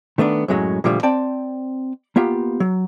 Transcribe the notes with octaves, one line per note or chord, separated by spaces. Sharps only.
D#3 A3 B3 D4
F#2 A2 F#3 G#3 C#4
A#2 D3 F3 G3 A3
C4 D5 G5 A5
A#3 B3 F4 G4
F#3